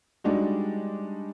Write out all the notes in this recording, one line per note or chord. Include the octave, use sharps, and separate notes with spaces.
G3 G#3 D4 D#4 F#4